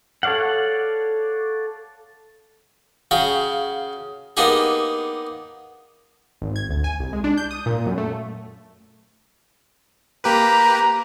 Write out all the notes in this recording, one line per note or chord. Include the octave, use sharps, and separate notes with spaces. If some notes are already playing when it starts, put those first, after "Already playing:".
A4 C#5 D5 F5 F#5
C#3 F#4 F5 G5
A#3 B3 D4 D#4 G4 G#4
G#1
G#6
D2
G#5
C2
G#3
D4
G6
D#6
A#2
F#2
A3
A#3 G4 B4 A#5